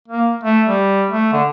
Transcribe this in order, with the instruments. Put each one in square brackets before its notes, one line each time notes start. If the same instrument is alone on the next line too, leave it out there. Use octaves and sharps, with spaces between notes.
[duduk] A#3
A3
G3
A3
D3